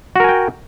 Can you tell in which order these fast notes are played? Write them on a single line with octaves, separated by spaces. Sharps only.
F#4 A#4 G#5 G5